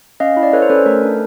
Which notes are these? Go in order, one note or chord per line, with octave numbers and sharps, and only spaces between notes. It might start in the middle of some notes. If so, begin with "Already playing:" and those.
C#4 D#5 F5
E4
D5
A4 B4 C#5
C5
C#4 A4 B4
A3 A#4
D4